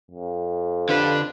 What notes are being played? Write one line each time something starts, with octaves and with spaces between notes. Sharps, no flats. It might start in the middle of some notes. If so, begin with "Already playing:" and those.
F2
D3 D4 F4 G4 B4